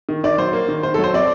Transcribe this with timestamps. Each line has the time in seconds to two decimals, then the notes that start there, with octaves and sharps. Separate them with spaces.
0.09 D#3
0.24 D#3 D5
0.38 F#3 C5
0.53 A#3
0.69 D#3
0.83 D#3 C5
0.94 A4
0.99 F#3
1.04 C5
1.14 C4 D5